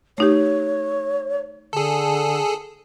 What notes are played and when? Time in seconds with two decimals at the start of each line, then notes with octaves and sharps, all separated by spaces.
0.18 A3 D#4 G4 C#5
1.73 D3 G#4 A4